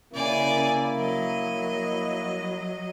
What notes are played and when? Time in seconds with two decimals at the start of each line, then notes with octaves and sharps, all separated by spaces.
0.13 C#3 A#3 E4 D5 G#5
0.97 F#3 D#5